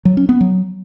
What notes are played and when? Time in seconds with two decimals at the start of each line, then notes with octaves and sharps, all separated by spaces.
0.05 F#3
0.17 C#4
0.29 B3
0.41 F#3